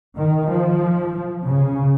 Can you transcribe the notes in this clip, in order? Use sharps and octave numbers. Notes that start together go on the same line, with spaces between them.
D#3
F3
C#3